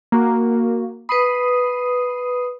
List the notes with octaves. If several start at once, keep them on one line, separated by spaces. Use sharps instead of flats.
A#3 F#4
B4 B5 D#6 C7 D#7